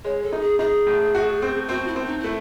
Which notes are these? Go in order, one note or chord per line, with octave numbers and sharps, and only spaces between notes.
G#3 C#5
A4
D#4
G#4
D#4 G#4
A2
F#4
C4
C4 F#4
E4
C4
D#4
A3 E4